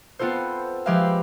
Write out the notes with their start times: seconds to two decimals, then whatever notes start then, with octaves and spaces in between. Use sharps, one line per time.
0.19 B3 C4 F4 A4 C5
0.86 F3 G#3 G4 B4 E5 F5